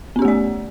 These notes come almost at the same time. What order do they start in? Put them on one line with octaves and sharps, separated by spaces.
B3 C#4 G4 A3 D5